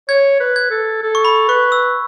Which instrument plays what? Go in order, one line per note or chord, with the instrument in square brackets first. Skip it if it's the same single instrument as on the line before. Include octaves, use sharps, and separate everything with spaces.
[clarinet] C#5 [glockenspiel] G#6
[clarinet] B4
[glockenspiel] G#6
[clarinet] A4
A4
[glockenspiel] C#6
B5
[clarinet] B4 [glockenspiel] C#6
[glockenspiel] E6